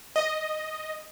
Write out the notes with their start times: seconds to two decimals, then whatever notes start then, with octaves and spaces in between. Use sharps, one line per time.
0.16 D#5